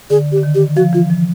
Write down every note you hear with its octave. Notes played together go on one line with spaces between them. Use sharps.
D3 G#4
G4
D3
D#3
G4
F3 F#4
E3 F4
F3